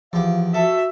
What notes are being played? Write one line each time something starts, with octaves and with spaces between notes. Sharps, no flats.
E2 F3 G4 F5
F#4 A4 E5